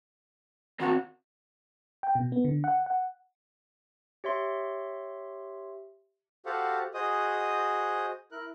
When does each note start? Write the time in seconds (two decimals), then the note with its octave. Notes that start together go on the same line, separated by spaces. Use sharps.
0.80 D#3 C4 F#4 A#4
2.03 G5
2.15 B2
2.32 B3
2.45 D3
2.64 F#5
2.86 F#5
4.24 G4 C#5 E5 C6
6.46 F#4 G4 A4 C5 F5 F#5
6.94 F#4 G#4 C5 D#5 D#6
8.32 E4 A#4 F#6